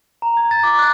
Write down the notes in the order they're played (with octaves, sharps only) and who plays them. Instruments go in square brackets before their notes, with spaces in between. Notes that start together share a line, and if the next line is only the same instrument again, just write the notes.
[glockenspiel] A#5
G#6
A6
D6
F#6